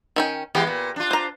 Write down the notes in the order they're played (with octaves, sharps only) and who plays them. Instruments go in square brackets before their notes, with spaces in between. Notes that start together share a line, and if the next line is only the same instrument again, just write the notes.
[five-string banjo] D#3 C#4 G5
[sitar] E3 G#3 G4 [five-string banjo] B3
[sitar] A#2
D4 F4
[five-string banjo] C5 A#5